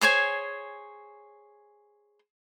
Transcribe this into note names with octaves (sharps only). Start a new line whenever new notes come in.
G#4 C5 C#5 G#5